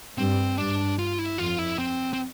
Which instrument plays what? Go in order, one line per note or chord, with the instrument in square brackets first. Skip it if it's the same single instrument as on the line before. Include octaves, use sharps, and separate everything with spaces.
[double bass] G2 [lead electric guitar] C4
[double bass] G2 [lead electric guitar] D4
[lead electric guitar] F4
E4
[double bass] F2 [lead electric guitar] F4
[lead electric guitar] E4
C4
C4